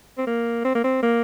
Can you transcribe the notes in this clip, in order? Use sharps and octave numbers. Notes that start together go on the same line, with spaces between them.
C4
A#3
C4
A#3
C4
A#3